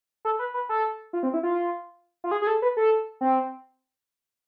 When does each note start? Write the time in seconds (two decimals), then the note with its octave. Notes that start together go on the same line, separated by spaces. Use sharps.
0.25 A4
0.39 B4
0.54 B4
0.69 A4
1.13 F4
1.23 C4
1.34 E4
1.43 F4
2.24 F4
2.31 G#4
2.42 G#4
2.47 A4
2.62 B4
2.77 A4
3.21 C4